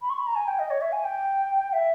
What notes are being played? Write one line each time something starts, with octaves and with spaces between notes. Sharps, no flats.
B5
C#6
B5
A#5
G#5
G5
D#5
C#5
E5
G#5
G5
E5